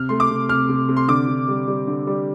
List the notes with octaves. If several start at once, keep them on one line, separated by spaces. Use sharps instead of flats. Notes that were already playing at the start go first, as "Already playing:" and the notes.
Already playing: C3 F6
A3 C6
D6
C3
C3 F6
C3
C3
C6
D3 D6
D3
G3
G3
D3
G3